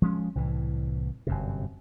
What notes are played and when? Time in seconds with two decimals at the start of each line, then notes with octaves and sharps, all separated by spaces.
0.02 F3 G#3 C#4
0.35 C2 A2 E3
1.27 G1 F#2 C3